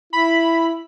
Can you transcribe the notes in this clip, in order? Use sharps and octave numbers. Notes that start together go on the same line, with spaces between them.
E4 B5